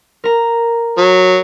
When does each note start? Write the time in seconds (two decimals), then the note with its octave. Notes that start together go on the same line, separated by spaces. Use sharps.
0.24 A#4 A#5
0.98 F#3